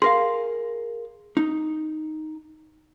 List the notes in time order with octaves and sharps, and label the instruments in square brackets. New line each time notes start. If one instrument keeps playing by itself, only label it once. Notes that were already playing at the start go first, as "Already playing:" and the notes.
[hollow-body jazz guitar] G#4 A#4 F5 [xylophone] C6
[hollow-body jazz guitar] D#4